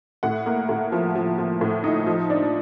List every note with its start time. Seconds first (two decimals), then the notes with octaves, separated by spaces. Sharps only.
0.23 A2 F#5
0.46 A#3
0.69 A2
0.92 F3
1.15 F3
1.38 F3
1.61 A2
1.84 D#4
2.06 F3
2.30 D4